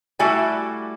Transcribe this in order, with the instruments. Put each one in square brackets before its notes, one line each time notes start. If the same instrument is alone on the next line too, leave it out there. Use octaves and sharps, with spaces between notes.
[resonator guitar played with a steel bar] G3 A3 E4 F#4 D5 G#5